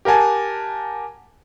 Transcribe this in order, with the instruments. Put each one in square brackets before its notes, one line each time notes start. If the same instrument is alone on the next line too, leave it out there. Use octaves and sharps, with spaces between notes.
[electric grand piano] G4 A#4 F#5 G#5 A5